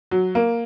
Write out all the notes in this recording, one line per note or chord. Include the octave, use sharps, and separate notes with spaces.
F#3
A#3